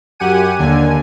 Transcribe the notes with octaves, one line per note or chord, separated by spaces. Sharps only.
F#2 G4 F#5 G#5 D#7
D#2 D3 G#5